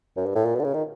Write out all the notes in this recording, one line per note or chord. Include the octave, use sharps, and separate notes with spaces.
F#2
G2
A2
A#2
B2
D3
C#3
D#3